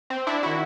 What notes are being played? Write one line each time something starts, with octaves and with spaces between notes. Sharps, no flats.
C4
D4 E4
D#3 E4 F#4